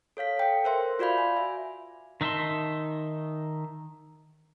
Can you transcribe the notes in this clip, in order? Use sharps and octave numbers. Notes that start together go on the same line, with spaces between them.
A4 C#5 F5 B6
A4 G5
A#4 C5 E5 C6
F4 F#4 D5 F5 B5
G#5
E5
D#3 D#4 E5 A5 C6